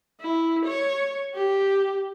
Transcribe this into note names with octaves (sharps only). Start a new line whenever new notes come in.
E4
C#5
G4